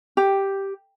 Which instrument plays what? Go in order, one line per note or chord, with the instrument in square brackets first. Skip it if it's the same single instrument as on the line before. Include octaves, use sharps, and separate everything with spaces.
[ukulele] G4